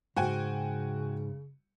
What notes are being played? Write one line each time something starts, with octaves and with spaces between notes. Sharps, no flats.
G#2 C#3 F#4 G5 G#5